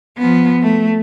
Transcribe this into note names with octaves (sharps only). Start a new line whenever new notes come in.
F3 B3
A3